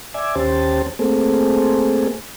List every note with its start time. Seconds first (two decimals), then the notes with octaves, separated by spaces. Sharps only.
0.14 D5 E5 G#5
0.35 D#2 C#4 G4 C5 A5
0.99 A3 A#3 C4 G#4 A4